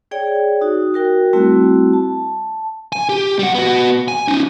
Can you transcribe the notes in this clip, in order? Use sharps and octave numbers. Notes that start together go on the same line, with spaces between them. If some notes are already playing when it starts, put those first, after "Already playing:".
G#4 C#5 D5 G5
D#4 F#4
F#4 A#4 G5
G3 A3 C4 E4 F#4
A5
G#5
G4
G3 F#5
B3 F#4
G#5
C#4 D#4